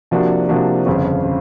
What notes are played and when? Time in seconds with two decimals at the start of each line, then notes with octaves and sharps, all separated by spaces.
0.11 C3 F3 A#3 D4 F#4
0.49 C3 F3 A#3 D4 F#4
0.86 G1 F2 C#3
1.25 C#3